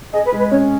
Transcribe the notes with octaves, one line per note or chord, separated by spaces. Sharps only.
G#4 D#5
B4
G#3
B4
C#4 C#5